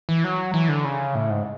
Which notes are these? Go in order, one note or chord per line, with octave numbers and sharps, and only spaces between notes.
E3
F#3
E3
D3
C#3
A2
G#2